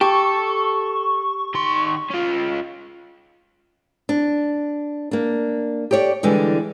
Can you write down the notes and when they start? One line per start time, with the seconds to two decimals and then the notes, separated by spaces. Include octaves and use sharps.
0.01 G4 A4 C#6
1.55 D#3 C6
2.10 C#4 F4
4.09 D4
5.11 A#3 D4
5.91 G4 A4 C#5 D5
6.23 D3 E3 G3 G#3